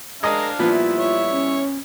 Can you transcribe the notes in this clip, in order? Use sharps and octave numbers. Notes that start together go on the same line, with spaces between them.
G#3 D4 A#4 D#5 F5 A#5
A#2 F3 G3 B3 E4 F4 E5
C#5
C#4